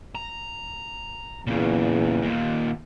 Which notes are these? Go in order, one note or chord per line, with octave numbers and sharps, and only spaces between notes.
A#5
E2 A#2 C#3
D#2 A#2